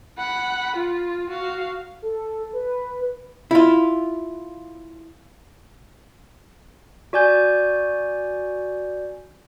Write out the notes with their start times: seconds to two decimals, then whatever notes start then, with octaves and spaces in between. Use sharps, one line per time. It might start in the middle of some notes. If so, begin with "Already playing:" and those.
0.18 F#5 B5
0.76 F4
1.30 F#4 F5
2.02 A4
2.53 B4
3.51 E4 F4
7.13 F#4 D5 G#5 G6